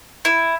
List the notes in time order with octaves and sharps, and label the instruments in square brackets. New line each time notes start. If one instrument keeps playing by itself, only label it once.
[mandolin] E4